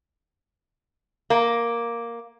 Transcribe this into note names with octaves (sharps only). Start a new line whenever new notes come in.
A#3